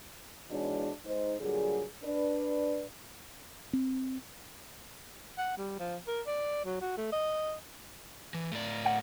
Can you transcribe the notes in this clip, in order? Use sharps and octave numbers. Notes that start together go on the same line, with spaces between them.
G#2 B2 E3 G#3 C#4 D4
G#3 D#4 C5
A#2 D3 F#3 G3 G#4
D4 B4 D5
C4
F#5
G3
F3
A#4
D5
F#3
F#4
A3
D#5
E3
A2 D5
F#5